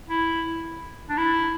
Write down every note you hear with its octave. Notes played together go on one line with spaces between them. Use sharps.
E4
D4
E4